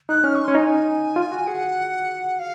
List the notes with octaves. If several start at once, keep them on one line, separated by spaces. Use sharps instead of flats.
D#4 F#6
C#4 F6
C#6
C#4 C6
D#4 G#5
F4
F#4
G#4 F#5
F5